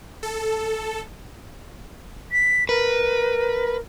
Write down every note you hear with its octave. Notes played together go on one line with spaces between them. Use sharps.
A4
B6
A#4 B4